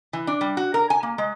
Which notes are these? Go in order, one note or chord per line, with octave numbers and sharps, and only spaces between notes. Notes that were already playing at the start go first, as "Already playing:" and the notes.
E3
D4
G3
F#4
A#4
G#5
A#3
G#3